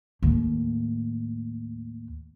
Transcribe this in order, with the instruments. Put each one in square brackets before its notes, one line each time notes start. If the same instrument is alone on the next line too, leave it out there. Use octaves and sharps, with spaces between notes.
[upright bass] D#2 A2